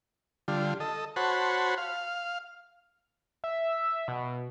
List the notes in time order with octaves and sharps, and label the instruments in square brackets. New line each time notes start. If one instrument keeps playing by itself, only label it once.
[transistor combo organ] D3 G3 F4
A4 D#5
F#4 C5 C#5 F#5 A5 B5
F5
[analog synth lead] E5
B2